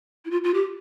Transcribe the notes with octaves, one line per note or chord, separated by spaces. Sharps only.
E4
F4
F4
G4